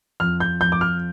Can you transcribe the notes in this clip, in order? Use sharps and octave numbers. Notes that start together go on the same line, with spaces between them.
F2 F6
G6
F2 G6
D6
F6